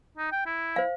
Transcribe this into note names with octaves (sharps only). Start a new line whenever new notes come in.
D#4
G5
E4
C5 F5